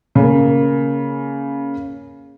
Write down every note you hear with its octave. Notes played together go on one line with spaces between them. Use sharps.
C#3 A#3